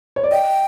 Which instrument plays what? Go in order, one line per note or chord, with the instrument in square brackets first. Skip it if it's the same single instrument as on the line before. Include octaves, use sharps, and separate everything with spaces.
[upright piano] C#5
D5
[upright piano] D#5 [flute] G5